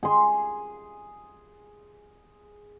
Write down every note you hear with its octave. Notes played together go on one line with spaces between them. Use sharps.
G#4 C6